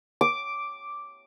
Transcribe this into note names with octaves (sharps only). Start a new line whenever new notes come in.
D6